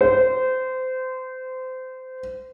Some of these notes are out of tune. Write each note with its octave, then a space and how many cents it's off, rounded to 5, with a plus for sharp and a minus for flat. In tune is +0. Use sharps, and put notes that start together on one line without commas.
C5 -25